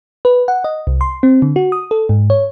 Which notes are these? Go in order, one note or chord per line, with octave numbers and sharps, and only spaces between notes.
B4
F#5
D#5
C2
C6
C4
D3
F#4
D#6
A4
G#2
C#5